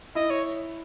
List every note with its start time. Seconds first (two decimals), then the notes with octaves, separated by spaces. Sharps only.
0.15 E4 D#5
0.30 C#5